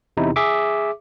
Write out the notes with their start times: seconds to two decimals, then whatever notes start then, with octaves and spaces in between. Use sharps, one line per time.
0.17 E2 C3 D#4 E4
0.36 G#4 E5 D6